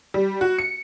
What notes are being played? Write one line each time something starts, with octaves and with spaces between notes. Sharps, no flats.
G3
F#4
C#7